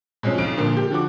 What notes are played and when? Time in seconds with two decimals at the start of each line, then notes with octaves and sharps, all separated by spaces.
0.23 B2 F3 G#3 C4 C#4
0.38 B1 D7
0.58 A#2 D3 F3 A#3
0.77 G4
0.91 D3 F3 F#4 D6